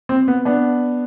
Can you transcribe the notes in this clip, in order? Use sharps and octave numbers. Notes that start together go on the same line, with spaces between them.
C4
B3
B3 D4